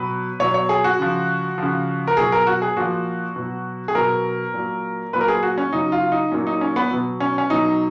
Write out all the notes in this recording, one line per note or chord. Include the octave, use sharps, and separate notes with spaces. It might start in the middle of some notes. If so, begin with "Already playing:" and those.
Already playing: B2 F#3 B4
B2 F#3 C#5
C#5
G#4
F#4
C#3 F3
C#3 F3
A#4
B2 F#3 G#4
A#4
F#4
G#4
A#2 F3 F#4
B2 F#3
G#4
B2 F#3 A#4
A#2 F#3
A#2 F#3 B4
A#4
G#4
F#4
C#4
C#3 F#3 D#4
F4
D#4
A#2 F#3 C#4
D#4
C#4
B3
B2 F#3
C#4
C#4
B2 F#3 D#4